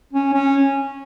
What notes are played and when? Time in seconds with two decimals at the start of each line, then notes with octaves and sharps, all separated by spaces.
0.13 C#4
0.34 C#4